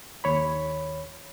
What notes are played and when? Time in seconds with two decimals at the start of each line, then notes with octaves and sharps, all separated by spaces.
0.24 D#2 C#5 B5